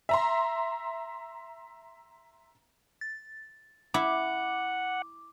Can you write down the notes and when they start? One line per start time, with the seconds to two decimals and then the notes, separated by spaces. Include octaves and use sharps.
0.09 E5 A#5 C6
3.01 A6
3.94 E4 F#5 D6